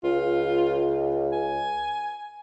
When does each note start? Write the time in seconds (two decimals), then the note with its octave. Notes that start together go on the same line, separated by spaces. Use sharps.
0.04 C#2 F4
1.32 G#5